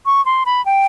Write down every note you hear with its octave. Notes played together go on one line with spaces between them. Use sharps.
C#6
C6
B5
G5